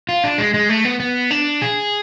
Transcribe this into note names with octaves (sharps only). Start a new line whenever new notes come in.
F4
D4
G#3
G#3
A3
B3
B3
D4
G#4